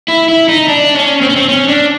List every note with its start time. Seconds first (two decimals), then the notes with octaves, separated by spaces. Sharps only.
0.08 E4
0.28 E4
0.48 D#4
0.68 D4
0.95 C#4
1.21 C4
1.29 C#4
1.36 C4
1.48 C#4
1.68 D4